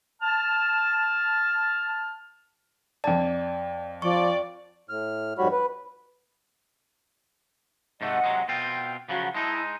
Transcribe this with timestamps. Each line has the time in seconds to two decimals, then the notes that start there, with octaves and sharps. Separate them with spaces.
0.22 A5 F6
3.04 F2 D5 A5
4.02 F3 D5 C#6
4.89 A2 F6
5.38 F2 G#2 G3 F#4 C#5 B5
5.52 B4
8.01 G#2 C3 A3 D#5 F#5
8.24 C3 F#3 G#3
8.48 B2 C4 F4 G5
9.09 C#3 F3 F#3 F#4 F#5
9.34 G#3 D#4 E4 A5